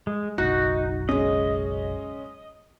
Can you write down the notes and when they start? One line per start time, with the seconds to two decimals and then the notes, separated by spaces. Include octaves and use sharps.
0.07 G#3
0.38 F#1 B1 D#4 F#4
1.09 G#3 C#4 D#5